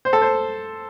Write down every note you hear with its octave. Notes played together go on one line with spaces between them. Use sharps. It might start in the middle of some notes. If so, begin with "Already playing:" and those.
C5
A4
C5